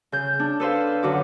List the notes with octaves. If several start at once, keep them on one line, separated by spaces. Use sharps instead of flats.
C#3 G6
D4
A4 B4 C5 F5
F#2 D3 F#4 D6